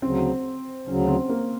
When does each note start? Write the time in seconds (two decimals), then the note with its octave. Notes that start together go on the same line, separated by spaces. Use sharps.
0.01 D2 C#3 F#3 C4
0.87 D2 C#3 F#3 C#4
1.07 C4
1.29 A#3